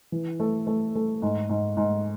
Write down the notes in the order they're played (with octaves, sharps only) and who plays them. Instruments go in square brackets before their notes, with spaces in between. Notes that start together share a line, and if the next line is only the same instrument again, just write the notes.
[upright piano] E3
A3
A3
A3
G#2
G#2
G#2